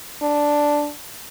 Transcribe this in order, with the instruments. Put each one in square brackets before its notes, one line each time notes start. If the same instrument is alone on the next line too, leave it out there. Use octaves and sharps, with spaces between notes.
[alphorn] D4